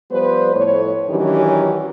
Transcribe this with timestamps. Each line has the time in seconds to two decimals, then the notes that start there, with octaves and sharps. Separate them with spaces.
0.10 F3 G3 B3 B4 C5
0.55 F2 A2 C#5
1.09 D#3 E3 F#3 C#4 D4 G4